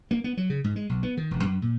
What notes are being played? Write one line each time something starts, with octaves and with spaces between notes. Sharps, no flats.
A#3
B3
F#3
C#3
G#2
G#3
B1
B3
D#3
E1
F#2
A#2